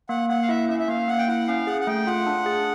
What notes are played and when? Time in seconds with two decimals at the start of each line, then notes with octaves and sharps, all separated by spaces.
0.09 A#3 F#5
0.29 A#3 F#5
0.42 F5
0.49 E4 E5
0.69 C#4 E5
0.80 E5
0.88 A#3 F5
1.08 A#3 F#5
1.19 G5
1.28 E4 F#5
1.47 C#4 F5
1.67 G#4 F#5
1.81 F#5
1.87 A3 G5
2.07 F4 F#5
2.27 D4
2.46 G#4